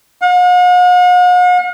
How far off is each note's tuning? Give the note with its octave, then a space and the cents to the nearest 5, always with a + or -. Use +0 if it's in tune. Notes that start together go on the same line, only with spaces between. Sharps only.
F#5 -45